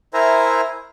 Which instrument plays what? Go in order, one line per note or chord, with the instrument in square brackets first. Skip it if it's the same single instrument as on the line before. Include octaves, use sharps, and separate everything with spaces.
[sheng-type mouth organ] E4 A#4 C5 E5 G#5 A#5